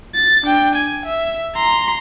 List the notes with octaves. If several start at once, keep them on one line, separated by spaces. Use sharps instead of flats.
A6
D4 G5
G#5
E5
A#5 C6